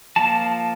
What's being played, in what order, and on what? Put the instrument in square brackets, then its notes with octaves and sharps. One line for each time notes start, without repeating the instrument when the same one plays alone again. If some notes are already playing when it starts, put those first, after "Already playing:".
[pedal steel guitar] F3 A#3 A5